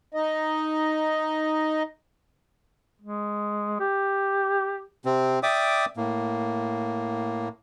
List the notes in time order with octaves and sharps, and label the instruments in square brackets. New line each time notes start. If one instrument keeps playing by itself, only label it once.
[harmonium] D#4 D#5
[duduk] G#3
G4
[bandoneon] C3 C4
D5 E5 G5 D6 D#6
A2 A#3